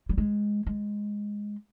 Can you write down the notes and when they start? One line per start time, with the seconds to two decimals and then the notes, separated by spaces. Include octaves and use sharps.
0.09 G3
0.18 G#3
0.67 G#3